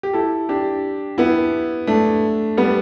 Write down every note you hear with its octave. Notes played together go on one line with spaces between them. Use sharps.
G4
E4 A4
D4 G4
B3 E4
A3 D4
G3 B3